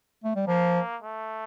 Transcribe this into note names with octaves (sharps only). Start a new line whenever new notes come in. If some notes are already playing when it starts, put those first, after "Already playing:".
A3
G3
F3 A#3
A3